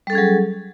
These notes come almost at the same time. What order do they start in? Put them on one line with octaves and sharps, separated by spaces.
G3 A4 C#4 G#4 F#3